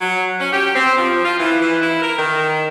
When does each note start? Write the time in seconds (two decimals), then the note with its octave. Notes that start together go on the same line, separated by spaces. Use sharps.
0.01 F#3
0.40 C#4
0.53 G4
0.75 C4
0.97 F3
1.25 F4
1.39 E3
1.60 E3
1.81 E4
2.02 A#4
2.18 D#3